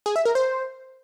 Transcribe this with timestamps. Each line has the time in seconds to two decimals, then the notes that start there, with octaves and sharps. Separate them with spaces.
0.06 G#4
0.16 E5
0.25 A#4
0.35 C5